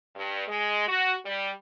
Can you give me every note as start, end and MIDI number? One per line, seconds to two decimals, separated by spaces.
0.15 0.44 43
0.48 0.84 56
0.88 1.14 66
1.25 1.50 55